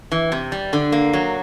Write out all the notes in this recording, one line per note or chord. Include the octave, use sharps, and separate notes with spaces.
E3
C3
G3
D3
A#3
F#3